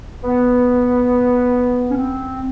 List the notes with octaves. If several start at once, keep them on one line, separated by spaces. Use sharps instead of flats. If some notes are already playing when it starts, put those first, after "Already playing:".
B3
C#4
C4